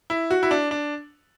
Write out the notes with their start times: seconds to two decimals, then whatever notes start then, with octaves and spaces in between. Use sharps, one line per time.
0.10 E4
0.31 F#4
0.43 E4
0.51 D4
0.71 D4